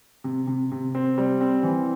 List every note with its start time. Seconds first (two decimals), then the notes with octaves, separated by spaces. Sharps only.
0.24 C3
0.47 C3
0.72 C3
0.95 C4
1.18 G3
1.41 C4
1.63 E3